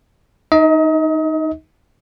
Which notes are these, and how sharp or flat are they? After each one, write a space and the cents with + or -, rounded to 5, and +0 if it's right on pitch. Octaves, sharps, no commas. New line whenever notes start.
D#4 +0 D#5 +35